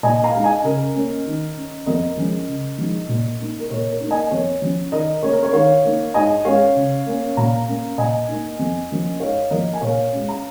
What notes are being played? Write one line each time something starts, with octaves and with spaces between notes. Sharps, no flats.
A#2 D#5 G#5
F5 A#5
G#3 D#4
D#5 G#5
C#3 A#4 D#5
A#3 C#4
D#3
C#4
F2 A#4 D#5
F3 G#3 C#4
C#3
F3 G#3 D#4
A#2
A#3 D#4
A#4
A#2 C#5
A#4
A#3 D#4
D#5 G#5
F2 C#5
F3 C#4
D#3 A#4 D#5
A#3 C#4 C#5
A#4
C#5
D#3 C#5 F5
A#3 D#4
G#2 D#5 G#5
G#3 C#4 C#5 F5
C#3
A#3 C#4
A#2 F5 A#5
A#3 C#4
A#2 D#5 G#5
A#3 D#4
F2
F3 A#3 C#4
G#2 C#5 F5
F3 A#3 A#4 D#5
G#5
A#2 C#5 F5
G#3 C#4
A#5